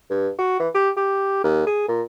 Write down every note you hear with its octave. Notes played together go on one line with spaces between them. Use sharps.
G2
F#4
E3
G4
G4
D#2
G#4
A#2